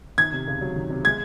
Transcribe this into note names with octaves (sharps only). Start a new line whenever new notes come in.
D#3 G#6
C3
C#2
F#3
D#3
C3
G#3 G#6